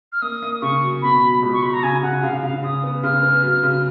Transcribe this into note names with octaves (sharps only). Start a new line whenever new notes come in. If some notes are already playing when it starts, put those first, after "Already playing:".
F6
A#3 D#6
A#3
C#3 C#6
F#3
B2 B5
F#3
C#2
C#6
F#3 B5
A#5
C#3 G#5
C#3 F#5
C#3 F5
C#3 F5
C#3 D#6
B3
C#3 F6
B3
F#3
C#3